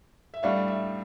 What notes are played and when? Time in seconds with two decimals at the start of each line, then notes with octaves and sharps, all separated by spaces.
0.34 E5
0.43 A2 G3 D4 F5
0.68 E5